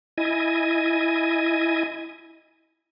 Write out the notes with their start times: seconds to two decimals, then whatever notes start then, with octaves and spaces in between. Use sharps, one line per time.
0.18 E4 D#5 G#5